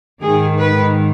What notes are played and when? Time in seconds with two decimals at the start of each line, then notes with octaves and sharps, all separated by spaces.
0.21 G#2 D#3 G#4
0.57 B4